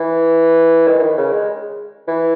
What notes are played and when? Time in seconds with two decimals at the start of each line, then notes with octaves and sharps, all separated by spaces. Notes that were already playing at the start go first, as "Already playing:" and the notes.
Already playing: E3
0.88 D#3
0.99 E3
1.03 D#3
1.17 C#3
1.33 G#3
2.07 E3